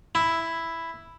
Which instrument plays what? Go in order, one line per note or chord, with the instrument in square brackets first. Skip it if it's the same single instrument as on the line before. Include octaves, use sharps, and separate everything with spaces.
[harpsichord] E4